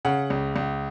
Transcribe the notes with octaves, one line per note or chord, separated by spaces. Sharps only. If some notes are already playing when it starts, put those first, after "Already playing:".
C#3 F#5
C#2
C#2